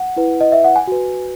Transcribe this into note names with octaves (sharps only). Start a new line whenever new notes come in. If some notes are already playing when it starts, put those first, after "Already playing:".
Already playing: F#5
E4 B4
D#5
E5
F#5
G#5
F#4 B4